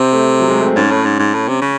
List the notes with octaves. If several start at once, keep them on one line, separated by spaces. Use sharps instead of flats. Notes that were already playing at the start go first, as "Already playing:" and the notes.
Already playing: C3 C4
A3
F#3
G#3
A3
C4
G#2 C#4
A2
G#2
G#2
A2
C3
C#3